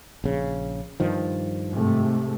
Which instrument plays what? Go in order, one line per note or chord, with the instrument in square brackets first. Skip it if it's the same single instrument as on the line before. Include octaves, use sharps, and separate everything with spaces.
[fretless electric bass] A#1 C#3
G2 D#3 F3
[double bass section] G#2 C3 A3